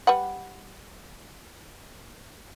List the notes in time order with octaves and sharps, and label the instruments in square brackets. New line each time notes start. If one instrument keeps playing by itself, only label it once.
[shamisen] G3 B4 F#5